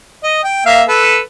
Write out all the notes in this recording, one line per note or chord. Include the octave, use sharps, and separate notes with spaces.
D#5
G5
A#3 E5 F5
A4 B4